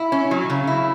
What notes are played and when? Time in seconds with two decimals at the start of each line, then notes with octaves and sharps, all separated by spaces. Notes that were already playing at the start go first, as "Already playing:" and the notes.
Already playing: E4
0.12 C#4
0.31 F#3
0.50 C#3
0.67 E4